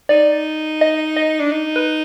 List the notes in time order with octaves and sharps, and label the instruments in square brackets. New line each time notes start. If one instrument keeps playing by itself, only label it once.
[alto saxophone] D#4 [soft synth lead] D5
[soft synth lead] D#5
D#5
[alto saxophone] D4
D#4
[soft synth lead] B4